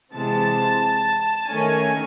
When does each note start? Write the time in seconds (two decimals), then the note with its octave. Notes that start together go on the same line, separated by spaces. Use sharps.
0.12 C3 E3 G#3 C4 A5
1.49 D#3 A3 C#4 G#5